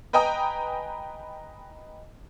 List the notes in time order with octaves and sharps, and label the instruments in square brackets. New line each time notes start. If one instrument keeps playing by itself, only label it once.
[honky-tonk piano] B4 D#5 G5 G#5 A#5 D#6